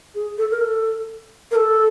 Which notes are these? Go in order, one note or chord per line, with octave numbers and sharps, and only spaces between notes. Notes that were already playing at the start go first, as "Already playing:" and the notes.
G#4
A4
A#4
A4
A#4
A4